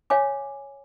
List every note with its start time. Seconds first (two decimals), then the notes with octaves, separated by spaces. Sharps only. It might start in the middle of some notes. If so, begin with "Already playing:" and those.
0.10 C#5 F5 G#5 D6